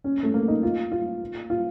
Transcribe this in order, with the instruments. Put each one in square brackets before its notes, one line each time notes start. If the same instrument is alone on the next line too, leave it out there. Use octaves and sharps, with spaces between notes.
[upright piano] C#4
A3
A#3
D#4
F4
F4
F4